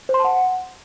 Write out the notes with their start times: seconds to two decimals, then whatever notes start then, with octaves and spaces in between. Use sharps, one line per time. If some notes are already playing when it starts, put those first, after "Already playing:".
0.09 C5
0.14 C6
0.19 A5
0.24 F#5